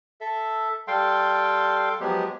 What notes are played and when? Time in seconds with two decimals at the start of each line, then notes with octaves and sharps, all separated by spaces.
0.21 A4 E5
0.88 G3 A4 F5 G5 C6
2.00 F3 F#3 G#3 B3 G4